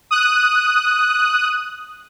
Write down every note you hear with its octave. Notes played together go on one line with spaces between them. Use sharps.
D#6 F#6